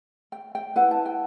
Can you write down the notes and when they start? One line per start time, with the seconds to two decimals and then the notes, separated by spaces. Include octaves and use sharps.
0.32 G5
0.55 G5
0.76 E4 B4 F#5
0.91 A5
1.05 G5